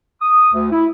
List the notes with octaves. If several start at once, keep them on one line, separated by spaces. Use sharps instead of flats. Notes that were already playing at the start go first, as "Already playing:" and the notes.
D#6
D2
E4